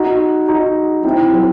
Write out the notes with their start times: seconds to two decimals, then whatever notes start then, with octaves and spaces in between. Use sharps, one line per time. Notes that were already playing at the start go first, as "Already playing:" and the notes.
Already playing: D#4 F#4
0.48 D#4 F#4
1.04 C4 E4
1.33 F#3